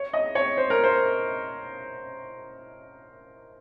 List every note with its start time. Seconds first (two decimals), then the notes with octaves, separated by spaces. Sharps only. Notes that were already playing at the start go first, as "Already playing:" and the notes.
Already playing: C#5
0.13 D#5
0.35 C#5
0.57 C5
0.70 A#4
0.84 C5